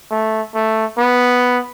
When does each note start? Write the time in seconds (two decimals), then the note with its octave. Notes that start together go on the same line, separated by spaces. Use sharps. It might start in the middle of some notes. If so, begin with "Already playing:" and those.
0.11 A3
0.55 A3
0.98 B3